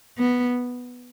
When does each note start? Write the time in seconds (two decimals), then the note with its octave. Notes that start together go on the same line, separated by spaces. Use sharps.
0.18 B3